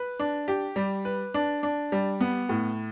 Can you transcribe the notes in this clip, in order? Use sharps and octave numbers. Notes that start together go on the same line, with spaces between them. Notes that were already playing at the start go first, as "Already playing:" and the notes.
Already playing: B4
D4
G4
G3
B4
D4
D4
G3
B3
A2